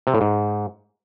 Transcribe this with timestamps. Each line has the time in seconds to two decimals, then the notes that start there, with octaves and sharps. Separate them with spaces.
0.07 C3
0.14 A2
0.21 G#2